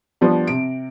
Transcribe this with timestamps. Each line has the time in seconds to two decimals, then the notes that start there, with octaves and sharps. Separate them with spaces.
0.21 F3 G3 B3 D4
0.47 C3 D7